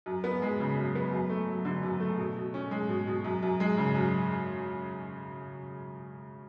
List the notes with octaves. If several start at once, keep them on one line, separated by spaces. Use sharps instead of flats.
F#2
B3
G#3
C#3
F#2
B3
F#2
A3
F#3
D3
F#2
A3
B2
B2
C#4
G#3
B2
B2
F#2
F#2
G#3
C#3
F#2